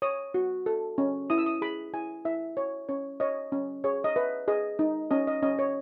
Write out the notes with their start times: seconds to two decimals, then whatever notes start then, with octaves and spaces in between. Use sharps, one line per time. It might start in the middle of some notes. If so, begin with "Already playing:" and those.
0.02 C#5 D#6
0.34 F#4
0.66 A4
0.98 C#4
1.30 E4 D#6
1.38 E6
1.46 D#6
1.62 G#4 B5
1.93 E4 G#5
2.25 E4 E5
2.57 C#5
2.89 C#4 C#5
3.20 C#5 D#5
3.52 C#4
3.84 G#4 C#5
4.04 D#5
4.16 B4 E5
4.48 G#4 D#5
4.79 D#4
5.11 C#4 D#5
5.27 D#5
5.43 C#4 D#5
5.59 C#5